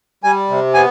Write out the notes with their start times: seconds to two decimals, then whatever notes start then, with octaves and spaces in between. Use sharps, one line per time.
0.24 G3 G#5
0.49 C3
0.74 B3 G#5